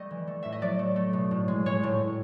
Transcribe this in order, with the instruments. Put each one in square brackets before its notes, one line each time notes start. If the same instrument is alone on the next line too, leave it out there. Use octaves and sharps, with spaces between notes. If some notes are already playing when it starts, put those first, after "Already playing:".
Already playing: [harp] G3 A3 D#5
E3
A3
A2 E5
D#5
F#3 D5
A3
A3
B2
A2
G#3
G#3 C#5
A2